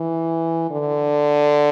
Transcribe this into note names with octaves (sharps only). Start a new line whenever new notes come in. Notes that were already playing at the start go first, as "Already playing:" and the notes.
Already playing: E3
D3